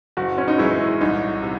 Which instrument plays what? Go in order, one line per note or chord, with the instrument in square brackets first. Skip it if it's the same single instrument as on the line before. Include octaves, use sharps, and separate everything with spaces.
[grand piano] F#1 [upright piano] F#4
[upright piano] C#4
D#4
[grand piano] F#2 E3 G#3 C#4 [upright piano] E4
[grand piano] C2 [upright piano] D#4
[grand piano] C3